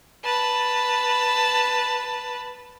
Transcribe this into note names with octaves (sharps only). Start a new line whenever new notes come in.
B4 A5